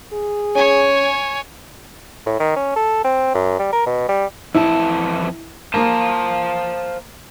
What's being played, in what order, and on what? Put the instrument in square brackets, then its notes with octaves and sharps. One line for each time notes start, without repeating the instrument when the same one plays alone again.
[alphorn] G#4
[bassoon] C#4 [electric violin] C#5 G#5
[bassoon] A2
D#3
C#4
A4
C4
F#2
G3
A#4
B2
G3
[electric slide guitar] F2 E3 A5 [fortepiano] E4
[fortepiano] A#3 [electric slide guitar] C5 F5 A5